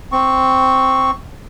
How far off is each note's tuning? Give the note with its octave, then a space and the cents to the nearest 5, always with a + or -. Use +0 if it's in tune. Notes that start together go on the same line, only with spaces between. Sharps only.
C4 +0 C#6 +0